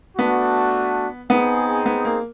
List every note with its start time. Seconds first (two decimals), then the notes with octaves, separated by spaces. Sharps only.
0.18 A3 B3 D4 F#4
1.30 B3 C4 D#4 G#4
1.86 B3
2.05 A#3